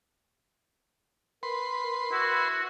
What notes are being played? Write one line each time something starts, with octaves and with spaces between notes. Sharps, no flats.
A#4 B4 C6
E4 F#4